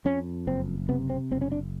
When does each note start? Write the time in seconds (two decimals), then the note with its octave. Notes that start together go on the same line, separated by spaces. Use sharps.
0.05 F2 C#4
0.47 F#1 C4
0.89 C3 B3
1.10 C4
1.31 F#1 C4
1.41 C#4
1.52 D4